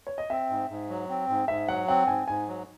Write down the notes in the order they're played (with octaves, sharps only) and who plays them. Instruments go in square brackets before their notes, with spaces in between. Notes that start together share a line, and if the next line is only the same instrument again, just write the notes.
[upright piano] C#5
D#5
[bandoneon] C4 [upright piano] E5
[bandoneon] G#2
G#2
F#3
C4
G#2
[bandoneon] G#2 [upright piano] E5
[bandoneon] F#3 [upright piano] F#5
[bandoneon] C4 [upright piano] F#5
[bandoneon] G#2 [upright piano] G#5
[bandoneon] G#2 [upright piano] G#5
[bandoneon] F#3